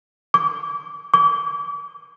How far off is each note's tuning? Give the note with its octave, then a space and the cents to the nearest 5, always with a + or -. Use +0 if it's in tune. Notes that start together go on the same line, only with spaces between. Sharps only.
D6 -30
D6 -35